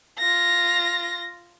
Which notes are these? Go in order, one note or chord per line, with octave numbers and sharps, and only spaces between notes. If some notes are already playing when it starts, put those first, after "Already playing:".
F4 A#6